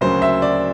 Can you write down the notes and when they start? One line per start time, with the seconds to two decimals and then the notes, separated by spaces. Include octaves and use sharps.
0.01 D2 C#3 F#3 A#3 C#4 C5
0.22 E5
0.42 D5